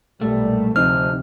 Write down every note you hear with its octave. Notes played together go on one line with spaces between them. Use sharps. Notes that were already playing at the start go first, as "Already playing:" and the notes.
B1 A#2 G3 A3
D2 C3 F3 C4 D#4 F6